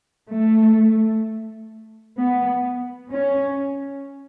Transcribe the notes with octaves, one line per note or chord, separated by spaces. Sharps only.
A3
B3
C#4